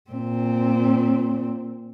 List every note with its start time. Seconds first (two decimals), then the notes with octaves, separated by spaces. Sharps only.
0.11 A#2 C4